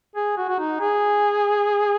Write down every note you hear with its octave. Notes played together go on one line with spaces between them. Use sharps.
G#4
F#4
F#4
D#4
G#4